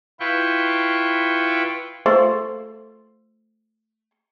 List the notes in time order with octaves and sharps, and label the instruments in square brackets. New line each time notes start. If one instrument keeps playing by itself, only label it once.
[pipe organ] E4 F4 B4 G5 C#6
[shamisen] A3 F4 C5